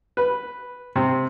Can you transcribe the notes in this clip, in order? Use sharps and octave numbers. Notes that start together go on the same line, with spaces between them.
B4
C3